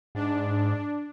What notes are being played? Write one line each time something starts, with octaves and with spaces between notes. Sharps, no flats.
G#2 D4